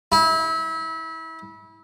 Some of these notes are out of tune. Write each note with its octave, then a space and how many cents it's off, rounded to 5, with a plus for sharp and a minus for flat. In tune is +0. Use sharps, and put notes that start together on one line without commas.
E4 -30